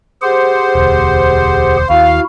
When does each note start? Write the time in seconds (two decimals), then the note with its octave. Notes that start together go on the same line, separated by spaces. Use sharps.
0.22 G4 G#4 C5 F#5
0.75 E1 D2
1.90 D#2 E4 F#4 F5